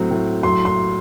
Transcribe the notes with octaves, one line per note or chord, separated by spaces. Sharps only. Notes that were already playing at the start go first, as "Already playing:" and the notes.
Already playing: A2 F#3 C4
A2
F#3 C6
C6